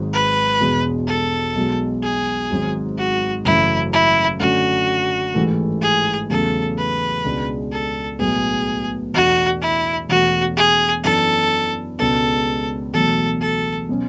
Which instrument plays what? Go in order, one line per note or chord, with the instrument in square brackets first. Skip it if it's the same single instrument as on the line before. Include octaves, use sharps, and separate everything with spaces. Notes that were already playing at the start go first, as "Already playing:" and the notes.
Already playing: [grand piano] G#1 G#2 F#3
[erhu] B4
[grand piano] E1 E2 B2 G#3
[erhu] A4
[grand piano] B1 B2 G#3
[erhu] G#4
[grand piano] G#1 G#2 F#3
[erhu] F#4
[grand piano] F#1 F#2 E3 A3 [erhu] E4
[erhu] E4
[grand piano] F#2 D3 A3 C#4 [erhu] F#4
[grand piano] A1 G#2 E3 A3
[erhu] G#4
[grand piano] E2 C#3 F#3 A3 [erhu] A4
[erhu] B4
[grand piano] C#2 B2 G#3 D4
[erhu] A4
[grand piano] B1 A2 G#3 B3 [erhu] G#4
[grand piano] E2 B2 A3 D4 [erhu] F#4
[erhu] E4
[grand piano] E1 E2 B2 A3 [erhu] F#4
[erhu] G#4
[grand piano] F#2 E3 B3 D4 [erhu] A4
[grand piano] C#2 B2 G#3 B3 D4 [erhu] A4
[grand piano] E1 E2 B2 F#3 A3 [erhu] A4
[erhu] A4
[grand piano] B2 F#3 C#4